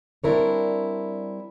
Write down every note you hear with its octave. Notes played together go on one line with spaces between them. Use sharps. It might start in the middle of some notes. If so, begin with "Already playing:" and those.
G3 C4 D4 E4 A#4 C#5